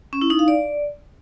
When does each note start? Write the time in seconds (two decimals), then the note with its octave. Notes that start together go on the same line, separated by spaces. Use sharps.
0.13 C#4
0.22 E4
0.30 D#4
0.39 F5
0.48 D5